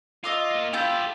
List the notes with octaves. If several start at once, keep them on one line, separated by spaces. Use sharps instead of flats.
F4 D#5 D6 E6
A#3 F4
E4 F4 G4 A4 G6